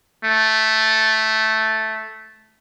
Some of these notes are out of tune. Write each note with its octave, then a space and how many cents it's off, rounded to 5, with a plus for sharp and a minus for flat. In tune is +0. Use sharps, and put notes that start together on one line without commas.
A3 -5